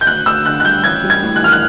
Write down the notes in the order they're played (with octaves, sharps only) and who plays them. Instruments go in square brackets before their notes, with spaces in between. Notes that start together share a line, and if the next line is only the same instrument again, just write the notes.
[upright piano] G6
D2 F#6
D2 E6
D3 F#6
F#6
G3 G6
A1 G#6
G3
G#6
A2
F#6
E3 F6
F#6